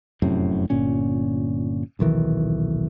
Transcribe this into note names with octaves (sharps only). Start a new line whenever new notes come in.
F1 F#2 A2 C3
G1 A#2 C#4
D#1 B1 D#3 E3